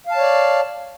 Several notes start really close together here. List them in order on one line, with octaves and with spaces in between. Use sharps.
F5 A5 C#5 D5